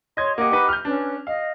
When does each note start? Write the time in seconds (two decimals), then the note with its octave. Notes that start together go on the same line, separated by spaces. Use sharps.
0.17 C#5 D#5 C6 G#6
0.38 A#3 G4 D#5 F#5 D6
0.51 D#4 B4
0.69 F6 G6
0.85 C#4 D4 B4
1.27 D#5 F5